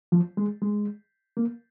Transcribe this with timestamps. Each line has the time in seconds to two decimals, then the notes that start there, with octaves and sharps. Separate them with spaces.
0.12 F3
0.37 G#3
0.62 G#3
1.37 A#3